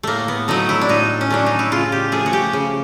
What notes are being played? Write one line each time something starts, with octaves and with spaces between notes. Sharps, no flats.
A2 A3 A#3
B3
F#3 A3 D#4
E4
D4
A2 D#4
C#4
F#3 A3 D4
D#4
E4
C#3 F4
G4
F3 A3 G#4
F#4
G4
C#3